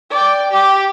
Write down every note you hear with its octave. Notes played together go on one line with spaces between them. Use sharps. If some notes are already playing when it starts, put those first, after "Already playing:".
D5 G5
G4